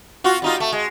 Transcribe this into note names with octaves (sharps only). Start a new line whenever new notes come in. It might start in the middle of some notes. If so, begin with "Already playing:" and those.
F4 F#4
G3 D#4 F4
A3
G#3